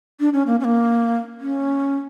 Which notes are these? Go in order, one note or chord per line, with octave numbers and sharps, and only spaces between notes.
D4
C#4
A#3
C#4
A#3
C#4